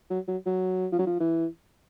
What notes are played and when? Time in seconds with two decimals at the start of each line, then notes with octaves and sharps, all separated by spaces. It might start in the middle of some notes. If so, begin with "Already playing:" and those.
0.10 F#3
0.28 F#3
0.46 F#3
0.92 F3
0.99 F#3
1.07 F3
1.20 E3